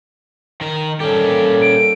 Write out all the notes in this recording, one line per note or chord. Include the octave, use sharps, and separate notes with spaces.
D#3 A#4
G3 A#3 C#4 G4 A4
D7